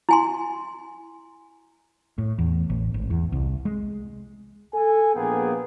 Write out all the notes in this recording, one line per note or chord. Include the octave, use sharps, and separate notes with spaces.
E4 G#5 C6
A2
E2
A1
G#1
E2
C2
G#3
A4 G#5
A#1 A#3 B3 G#4 G5